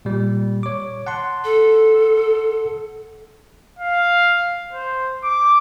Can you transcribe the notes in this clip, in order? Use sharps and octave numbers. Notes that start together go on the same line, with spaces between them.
A#2 G3
C#5 D6
F#5 A5 C6
A4
F5
C5
D6